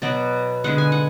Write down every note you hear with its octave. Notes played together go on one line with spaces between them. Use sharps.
B2 F#3 B3 D5
D3 G#3 B3 F#5
G#5
F#5